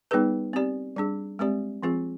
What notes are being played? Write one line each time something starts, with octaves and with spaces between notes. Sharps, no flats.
G3 B3 D#4 G#4 B4
C4 G4 D5
G3 D4 G#4
G#3 C4 G4 D5
F3 C4 F4 G#4